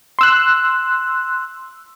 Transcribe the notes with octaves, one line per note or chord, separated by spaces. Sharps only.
C6 E6 F#6